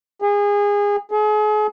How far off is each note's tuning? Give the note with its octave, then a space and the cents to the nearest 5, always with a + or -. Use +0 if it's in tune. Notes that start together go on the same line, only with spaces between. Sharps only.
G#4 -25
G#4 +40